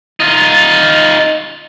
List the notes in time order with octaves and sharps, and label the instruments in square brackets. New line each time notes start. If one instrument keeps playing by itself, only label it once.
[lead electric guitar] D#4 F4